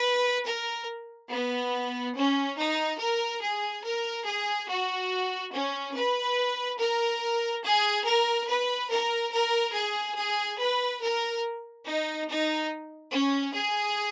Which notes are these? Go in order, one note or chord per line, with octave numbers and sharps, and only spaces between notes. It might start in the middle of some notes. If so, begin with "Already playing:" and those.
Already playing: B4
A#4
B3
C#4
D#4
A#4
G#4
A#4
G#4
F#4
C#4
B4
A#4
G#4
A#4
B4
A#4
A#4
G#4
G#4
B4
A#4
D#4
D#4
C#4
G#4